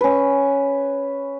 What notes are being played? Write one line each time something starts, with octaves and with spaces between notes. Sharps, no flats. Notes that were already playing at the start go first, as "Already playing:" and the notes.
C#4 B4